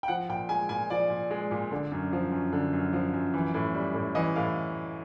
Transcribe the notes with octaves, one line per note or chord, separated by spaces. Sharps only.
G5
F3 F#5
A#2 G5
G#3 G#5
A#2 G#5
F3 D5
A#2
G#3
A#2
D3
F#2
F3
F#2
D3
F#2
F3
F#2
E3
A2
G3
A2
E3 D#5
A2 F5